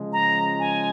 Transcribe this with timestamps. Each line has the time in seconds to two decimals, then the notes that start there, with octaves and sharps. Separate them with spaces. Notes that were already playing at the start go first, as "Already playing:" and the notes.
Already playing: C#3 F3 G#3
0.13 A#5
0.60 G#5